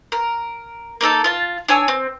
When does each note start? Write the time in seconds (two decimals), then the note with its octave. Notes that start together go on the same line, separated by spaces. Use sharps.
0.12 A#4
1.01 A#3 D#4 A4 A5
1.24 F4 A5
1.68 D4 C#5 G#5 E6
1.88 C4